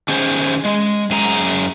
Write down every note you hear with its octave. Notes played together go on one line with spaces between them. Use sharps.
D#3 C#4 G#4 C5
G#3
F#2 G#4 A#5